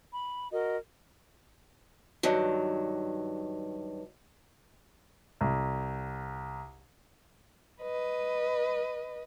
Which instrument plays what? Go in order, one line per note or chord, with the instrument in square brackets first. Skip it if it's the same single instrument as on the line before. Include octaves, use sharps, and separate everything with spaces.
[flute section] B5
F#4 A#4 D#5
[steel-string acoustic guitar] G2 D#3 F#3
[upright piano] C2
[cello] B4 D#5